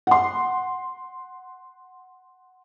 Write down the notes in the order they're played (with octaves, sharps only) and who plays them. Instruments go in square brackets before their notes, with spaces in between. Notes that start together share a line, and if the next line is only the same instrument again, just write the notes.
[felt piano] F#5 C6